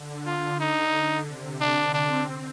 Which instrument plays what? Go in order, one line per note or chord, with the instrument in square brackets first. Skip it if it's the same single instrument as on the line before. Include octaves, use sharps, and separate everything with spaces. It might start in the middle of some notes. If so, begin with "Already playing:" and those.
Already playing: [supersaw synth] D3
[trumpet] F4
[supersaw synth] D3 [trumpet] D#4
[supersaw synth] C3
[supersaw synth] D3 [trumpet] D4
[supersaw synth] C4 [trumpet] D4